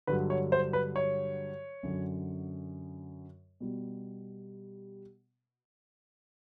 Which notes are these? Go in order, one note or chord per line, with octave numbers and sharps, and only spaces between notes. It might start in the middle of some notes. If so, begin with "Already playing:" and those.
G2 D3 F#3 B4
C#5
C5
B4
C#5
F#2 D3 F#3
B2 G3